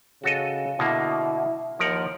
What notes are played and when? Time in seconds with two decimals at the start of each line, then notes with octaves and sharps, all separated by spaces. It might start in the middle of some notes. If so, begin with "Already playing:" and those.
0.24 C#3 F#4 A4 D#5
0.79 B2 D3 A#3 E4
1.79 D#2 F3 A#4 F#5